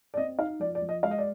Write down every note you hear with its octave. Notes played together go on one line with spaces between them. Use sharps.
D5
C4 D#5
D#4 F5
F3 D5
D5
F3
D#5
G#3 F5
D#5
D5